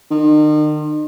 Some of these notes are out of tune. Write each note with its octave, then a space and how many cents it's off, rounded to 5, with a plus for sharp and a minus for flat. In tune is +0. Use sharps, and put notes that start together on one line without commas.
D#3 -40